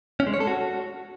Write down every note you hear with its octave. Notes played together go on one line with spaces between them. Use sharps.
C#4
G#3
C#5
A4
F#4